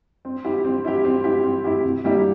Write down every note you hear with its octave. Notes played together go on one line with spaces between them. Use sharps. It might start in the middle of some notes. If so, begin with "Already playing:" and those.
C4
E4 G4
C4
E4 G4
C4
E4 G4
C4
E4 G4
C3
G3 A#3 E4 G4